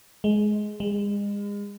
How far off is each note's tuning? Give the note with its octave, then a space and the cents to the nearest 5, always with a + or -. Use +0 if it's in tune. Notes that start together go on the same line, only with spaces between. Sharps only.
G#3 +15
G#3 -35